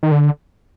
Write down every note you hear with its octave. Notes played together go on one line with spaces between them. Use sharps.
D#3
D3